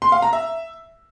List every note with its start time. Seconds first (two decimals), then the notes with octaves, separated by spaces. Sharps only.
0.02 C6
0.12 F5
0.22 A#5
0.33 E5